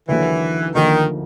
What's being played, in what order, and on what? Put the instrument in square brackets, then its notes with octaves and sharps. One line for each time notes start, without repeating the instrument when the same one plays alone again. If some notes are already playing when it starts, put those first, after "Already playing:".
[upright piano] D#2 D3 F#3 [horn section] E3
[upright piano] D2 D3 F3 A#3 D#4 [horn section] D#3